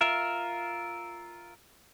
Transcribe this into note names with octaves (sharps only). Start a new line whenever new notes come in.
F4 A#4 E5